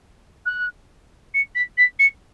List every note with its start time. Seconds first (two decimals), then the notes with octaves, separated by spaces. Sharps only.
0.46 F#6
1.34 C#7
1.55 B6
1.77 B6
1.99 C#7